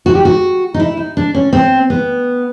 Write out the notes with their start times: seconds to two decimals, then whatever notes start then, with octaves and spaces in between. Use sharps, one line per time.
0.06 F#4
0.15 G4
0.25 F#4
0.74 D#4
0.80 E4
0.97 D#4
1.17 D4
1.35 C#4
1.53 C4
1.90 B3